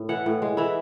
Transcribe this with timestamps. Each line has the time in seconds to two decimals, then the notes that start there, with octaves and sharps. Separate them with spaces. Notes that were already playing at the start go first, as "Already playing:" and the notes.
Already playing: A2
0.09 E3 F#5
0.26 A2
0.42 G#3
0.57 E3 E4